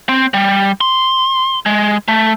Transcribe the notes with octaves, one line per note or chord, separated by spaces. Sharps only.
C4
G3
C6
G#3
A3